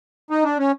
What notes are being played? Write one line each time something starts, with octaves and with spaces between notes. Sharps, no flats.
D#4
D4
C#4